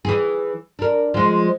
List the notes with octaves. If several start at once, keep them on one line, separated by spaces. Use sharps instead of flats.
E3 G#4
D4 A#4
F3 G#3